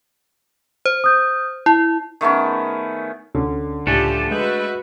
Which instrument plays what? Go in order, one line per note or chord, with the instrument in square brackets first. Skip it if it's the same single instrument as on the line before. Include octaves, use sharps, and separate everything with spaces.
[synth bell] C5
[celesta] D#6 G6
[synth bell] E4 [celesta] A5
[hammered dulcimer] D#3 A3 B3 C#4
[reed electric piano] D2 C#4 [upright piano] D3
[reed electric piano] C#2 A2 G#5 [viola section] F3 G4 [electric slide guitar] A3 D4 A4
[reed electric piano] G#3 D#5 G6 [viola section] F#4 B4 E5